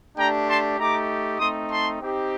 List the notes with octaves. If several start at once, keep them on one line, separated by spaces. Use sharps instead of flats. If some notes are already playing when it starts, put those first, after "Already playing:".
A3 D4 G4 G5 A#5
A5 C6
A3 D#4 G4 A#5 D6
A3 C4 D#4 C6 D#6
A5 C6
C4 D#4 G4